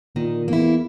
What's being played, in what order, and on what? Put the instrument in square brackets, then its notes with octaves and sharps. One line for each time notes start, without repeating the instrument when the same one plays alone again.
[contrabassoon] A#2 [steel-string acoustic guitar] D#3
[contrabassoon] E2 [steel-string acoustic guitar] A#3 E4